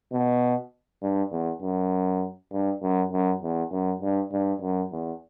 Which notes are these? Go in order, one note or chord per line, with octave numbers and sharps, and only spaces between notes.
B2
G2
E2
F#2
G2
F#2
F#2
E2
F#2
G2
G2
F#2
E2